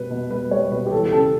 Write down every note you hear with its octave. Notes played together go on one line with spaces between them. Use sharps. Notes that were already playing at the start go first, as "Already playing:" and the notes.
Already playing: B2 G3 B4
B2
G3 B4
G3 C#5
B2 B4
G4
E3 A4
G4
C#3 A4